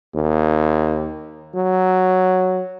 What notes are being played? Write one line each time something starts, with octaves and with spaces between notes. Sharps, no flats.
D#2
F#3